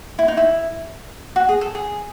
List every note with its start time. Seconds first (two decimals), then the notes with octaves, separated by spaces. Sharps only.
0.19 E4
0.28 D#4
0.37 E4
1.36 F#4
1.49 G#4
1.61 A4
1.75 G#4